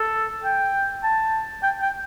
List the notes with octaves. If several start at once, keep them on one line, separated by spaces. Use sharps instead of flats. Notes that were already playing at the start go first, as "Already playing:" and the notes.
Already playing: A4
G5
A5
G5
G5